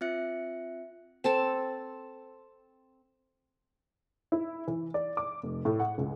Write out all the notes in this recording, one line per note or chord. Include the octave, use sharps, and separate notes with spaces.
C4 F4 E5 F#6 C#7
C4 A4 A5
E4
E3
D5
D6
F1
A2
F#5
C#2